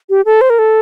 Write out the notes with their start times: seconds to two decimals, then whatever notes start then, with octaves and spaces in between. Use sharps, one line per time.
0.10 G4
0.25 A4
0.41 C5
0.50 A#4
0.59 A4